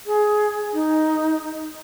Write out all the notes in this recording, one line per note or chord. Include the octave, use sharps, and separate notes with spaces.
G#4
D#4